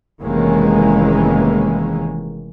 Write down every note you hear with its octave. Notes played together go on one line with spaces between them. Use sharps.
F1 D#3 E3 G#3 A#3 C#4